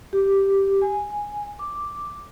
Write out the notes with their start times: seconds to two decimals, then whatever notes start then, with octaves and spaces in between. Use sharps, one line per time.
0.13 G4
0.82 G#5
1.59 D6